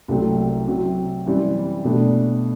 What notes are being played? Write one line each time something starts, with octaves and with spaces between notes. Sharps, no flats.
C2 C3 F#3 A3 C4
C3 F#3 C4 F#4
F#2 E3 G3 C4 G4
B2 A3 D4